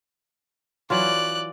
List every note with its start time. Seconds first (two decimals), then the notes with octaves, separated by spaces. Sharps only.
0.90 E3 F#3 F4 D5 F#6